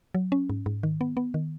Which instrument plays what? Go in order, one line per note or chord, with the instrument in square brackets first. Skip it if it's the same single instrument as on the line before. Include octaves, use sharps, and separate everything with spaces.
[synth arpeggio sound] F#3
C#4
G#2
G#2
D#3
B3
B3
D#3